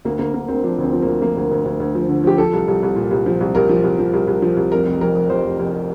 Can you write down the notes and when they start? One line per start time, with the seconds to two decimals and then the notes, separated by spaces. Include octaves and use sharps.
0.05 D2 A#3
0.19 D2 A#3
0.34 D3 A#3
0.48 D2 C4
0.64 F3 D4
0.78 D2 C4
0.93 F3
1.02 A#3
1.07 D2
1.21 F3 A#3
1.37 D2
1.51 D2
1.65 D2
1.80 D2
1.95 F3
2.09 D3
2.24 F3 G4
2.38 F3 A4
2.53 C2
2.68 C2
2.83 C2
2.96 A#2
3.11 C2
3.26 F3
3.41 C2
3.55 C2 A#4
3.69 F3
3.84 C2
3.99 F3
4.13 C2
4.27 C2
4.42 F3
4.57 C2
4.72 F1 A#4
4.86 F1
5.01 F2 A#4
5.15 F2
5.30 F2 C5
5.44 F1
5.60 F1